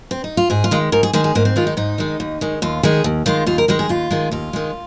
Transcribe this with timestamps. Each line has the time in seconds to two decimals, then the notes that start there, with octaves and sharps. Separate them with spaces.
0.11 C4
0.24 D#4
0.37 F4
0.50 G#2 G#4
0.64 F4
0.71 D#3 G#3
0.92 G#2 A#4
1.03 G#4
1.13 D#3 G#3 G#4
1.24 G#4
1.35 G#2 A#3
1.45 C4
1.56 D#3 G#3 F4
1.67 D#4
1.77 G#2 D#4
1.98 D#3 G#3
2.20 D#2
2.41 D#3 G#3
2.62 D#2 F4
2.83 D#3 G#3 G#4
3.04 D#2
3.26 D#3 G#3 F4
3.46 D#2 F4
3.58 A#4
3.68 D#3 G#3 A#4
3.79 G#4
3.89 D#2 F4
4.11 D#3 G#3
4.32 D#2 F4
4.53 D#3 G#3